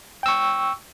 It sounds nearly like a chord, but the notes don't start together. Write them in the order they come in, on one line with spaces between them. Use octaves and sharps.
G5 E6 C#6